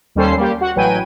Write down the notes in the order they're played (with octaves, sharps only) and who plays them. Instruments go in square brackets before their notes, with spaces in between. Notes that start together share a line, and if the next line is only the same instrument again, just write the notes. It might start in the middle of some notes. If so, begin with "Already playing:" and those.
[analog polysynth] D#2 G3 C#4 A4 C5 C7
G3 A#3 G4
F#4 F#5
A1 F#3 B4 G5 G#5 D#7